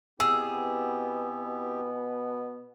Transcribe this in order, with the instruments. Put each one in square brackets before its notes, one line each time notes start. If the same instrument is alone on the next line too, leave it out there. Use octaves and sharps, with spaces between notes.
[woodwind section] B2 B3 [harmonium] C4 E4 G4 [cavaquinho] G#4 [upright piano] E6